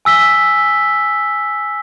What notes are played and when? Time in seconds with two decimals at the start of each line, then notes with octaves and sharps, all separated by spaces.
0.05 G#5 E6 B6 G7